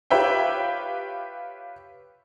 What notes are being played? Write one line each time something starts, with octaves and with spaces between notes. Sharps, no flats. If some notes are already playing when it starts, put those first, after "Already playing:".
F4 G4 B4 C#5 E5 G5